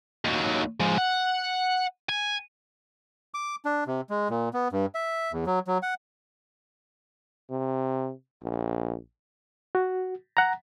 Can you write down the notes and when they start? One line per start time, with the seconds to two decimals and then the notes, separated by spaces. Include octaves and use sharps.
0.25 D#2 F#3
0.80 F3 G#3
0.98 F#5
2.09 G#5
3.34 D6
3.65 D4
3.87 C3
4.10 G#3
4.30 A#2
4.54 B3
4.72 G2
4.95 E5
5.32 E2
5.47 F#3
5.67 F#3
5.83 F#5
7.50 C3
8.43 A#1
9.75 F#4
10.37 F#5 A#5